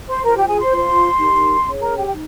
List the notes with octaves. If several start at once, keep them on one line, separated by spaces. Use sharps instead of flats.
C5 C6
F4 A#4 C5 A#5
G4 G5
G#4 G#5
C5 C6
F4 C5
D#4 G4 A#4
C#4 G#4 C#5
A#4 A#5
G4 G5
G5
D#4